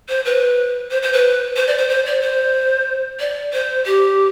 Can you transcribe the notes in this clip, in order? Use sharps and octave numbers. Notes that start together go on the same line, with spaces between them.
C5
B4
C5
C5
B4
C5
D5
C5
C5
D5
C5
D5
C5
G4